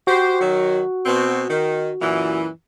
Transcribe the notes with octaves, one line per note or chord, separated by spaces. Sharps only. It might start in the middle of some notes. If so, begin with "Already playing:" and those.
F#4 G4 C5
D#3 F#3
B2 C4
D#3
F#2 A#2 E3